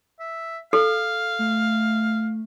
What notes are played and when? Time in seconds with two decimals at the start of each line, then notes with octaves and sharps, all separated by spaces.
0.20 E5
0.73 A4 F5
1.39 A3